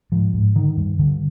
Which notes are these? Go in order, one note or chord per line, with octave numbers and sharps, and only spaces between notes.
G#2 F3
G#2
D3 D#3
G2
G2 D3